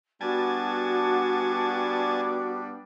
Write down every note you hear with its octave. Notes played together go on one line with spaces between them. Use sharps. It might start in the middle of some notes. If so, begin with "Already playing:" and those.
G3 B3 D4 F#4 G#5 A5